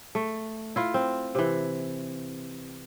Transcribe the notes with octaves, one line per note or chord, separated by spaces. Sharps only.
A3
E4 F4
C4
C3 E3